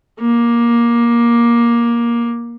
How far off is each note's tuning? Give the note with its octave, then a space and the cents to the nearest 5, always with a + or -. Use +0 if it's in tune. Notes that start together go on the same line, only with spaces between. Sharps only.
A#3 +15